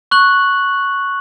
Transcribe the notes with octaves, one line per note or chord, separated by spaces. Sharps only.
C#6 F#6 F#7